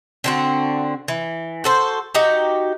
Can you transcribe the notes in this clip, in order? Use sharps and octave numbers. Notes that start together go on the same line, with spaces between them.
D3 C4 F#4
E3
F#4 A4 C5
D#4 F#4 G4 A#5